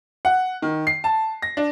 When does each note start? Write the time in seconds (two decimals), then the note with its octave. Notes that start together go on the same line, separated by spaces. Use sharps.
0.25 F#5
0.62 D#3
0.87 C7
1.04 A5
1.42 A#6
1.57 D4